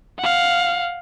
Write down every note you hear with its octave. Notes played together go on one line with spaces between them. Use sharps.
F5 F#5